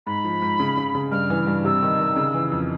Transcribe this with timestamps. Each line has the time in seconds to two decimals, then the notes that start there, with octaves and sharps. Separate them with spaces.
0.06 G#2 B5
0.24 F3
0.42 G#2
0.60 C#3
0.77 C#3
0.95 C#3
1.11 G2 F6
1.30 E3
1.47 G2
1.65 C3 E6
1.83 D#3
1.99 D#3
2.16 C#3
2.34 E3
2.52 F2